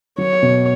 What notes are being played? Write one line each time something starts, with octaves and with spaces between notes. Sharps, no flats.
F#3 C#5
B2